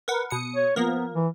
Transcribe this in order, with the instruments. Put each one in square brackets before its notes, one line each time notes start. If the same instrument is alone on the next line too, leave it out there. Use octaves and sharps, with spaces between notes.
[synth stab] A#4 B4 F#5
B2 D#6 C#7
[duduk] C#5
[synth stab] F3 A#3 A#4 [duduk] B3
[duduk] E3